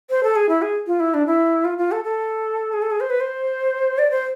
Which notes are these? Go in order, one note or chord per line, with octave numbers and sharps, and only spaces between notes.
C5
A4
G#4
E4
G#4
F4
E4
D4
E4
F4
F4
A4
A4
G#4
A4
G#4
C5
B4
C5
D5
C5